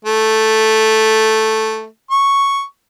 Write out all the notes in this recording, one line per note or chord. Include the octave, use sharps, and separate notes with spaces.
A3
C#6